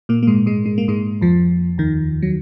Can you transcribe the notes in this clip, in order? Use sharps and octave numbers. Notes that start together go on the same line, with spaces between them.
A#2 A#3
A#3
G#2 G#3
G#2 G#3
G#3
A#3
G#2 G#3
F2 F3
D#2 D#3
F#3